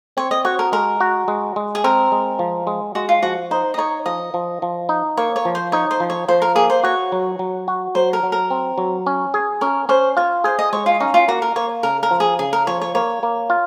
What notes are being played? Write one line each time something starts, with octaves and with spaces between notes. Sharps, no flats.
C4 C#5
D#5
F#4 C#5
A#4
G#3 A#4
F#4
G#3
G#3
G#4
C4 A#4
G#3
F3
G#3
G#3 F#4
F4
F3 F#4
D#4 C5
D#5
D#4 C#5
F3 D#5
F3
F3
D#4
A#3 C#5
C#5
F3
C5
D#4 C#5
C5
F3
C#5
F3 C5
A#4
A#3 G#4
C5
F#4 C#5
F#3
F#3
F#4
F#3 C5
A#4
F#3
A#4
C4
F#3
C#4
G#4
C#4 A#4
C#4 C5
F4 C#5
G#4 C5
D#5
G#3 C#5
F4
C#4 D#4
F4
A#3 F#4
A#4
A#3 C#5
C#3 A#4
A#4
F3
G#4
C#3 G#4
A#4
F3 C#5
C#5
A#3 C#5
A#3
F4